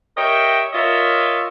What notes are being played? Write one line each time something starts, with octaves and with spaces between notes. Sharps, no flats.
G4 A#4 C#5 D#5 E5 G5
F4 A#4 C#5 D#5 E5